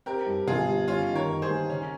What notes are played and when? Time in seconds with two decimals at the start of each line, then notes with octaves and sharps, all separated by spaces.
0.06 C4 G4 A#4
0.26 G2
0.48 G1 F4 G#4
0.67 G3
0.88 G2 C#4 F4
1.08 D#3
1.15 A#4 C#5
1.29 G2
1.42 G#4 C5
1.49 A#3
1.70 C#3 C#4